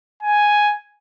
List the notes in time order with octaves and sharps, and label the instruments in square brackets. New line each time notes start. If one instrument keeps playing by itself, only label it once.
[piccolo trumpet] G#5